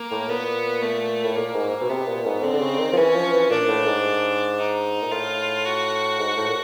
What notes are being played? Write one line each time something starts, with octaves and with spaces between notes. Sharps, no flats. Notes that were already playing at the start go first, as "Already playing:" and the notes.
Already playing: A#3
A2
A#2 B3
A3
A2
A#2 A#3
G#2
B2
C3 B3
A#2
G#2
D3 C4
D3
C#3
D#3
F3
E3 C#4
F3
E3
A#2 D4
A2
G#2
D#4
A#2
A2 F4
F#4
G#2
A2
A#2